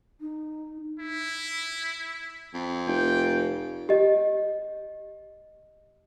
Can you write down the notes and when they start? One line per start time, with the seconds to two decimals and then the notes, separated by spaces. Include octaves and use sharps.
0.21 D#4
1.00 E4
2.54 F2
2.87 F1 G5
3.89 G4 D#5